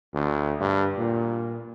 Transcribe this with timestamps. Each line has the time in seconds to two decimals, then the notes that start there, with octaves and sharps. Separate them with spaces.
0.14 D2
0.61 G2
0.98 A#2